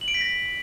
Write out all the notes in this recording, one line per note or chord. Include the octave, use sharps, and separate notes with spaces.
F#7
D7
B6
A#6